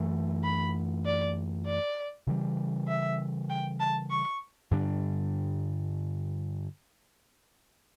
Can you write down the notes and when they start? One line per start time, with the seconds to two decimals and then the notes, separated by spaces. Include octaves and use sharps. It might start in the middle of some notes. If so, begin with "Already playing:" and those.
Already playing: F#2 E3 A3 D4
0.44 B5
1.05 D5
1.66 D5
2.27 C#3 E3 G3
2.88 E5
3.50 G5
3.80 A5
4.10 C#6
4.71 G2 D3 G3 D4